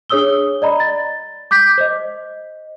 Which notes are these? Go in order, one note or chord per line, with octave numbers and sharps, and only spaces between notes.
D4 G#4 C#5 D#6 E6 G7
D5 D#5 A#5 B5
A6
D6 G6 B6
C5 D#5